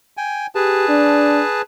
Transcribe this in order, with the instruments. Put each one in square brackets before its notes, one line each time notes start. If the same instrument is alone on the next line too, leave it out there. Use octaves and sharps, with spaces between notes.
[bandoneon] G5 G#5
[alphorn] G4 [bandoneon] G#4 B4 A5
[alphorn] D4